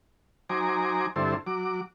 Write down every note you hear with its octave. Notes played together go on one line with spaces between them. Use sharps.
F#3 D#4 C5 G#5 A#5 D6
G2 D3 C4 E4 A4 C5
F#3 D6